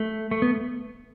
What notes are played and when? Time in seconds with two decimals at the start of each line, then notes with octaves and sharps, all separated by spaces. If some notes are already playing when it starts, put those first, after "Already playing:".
Already playing: A3
0.31 A3
0.42 B3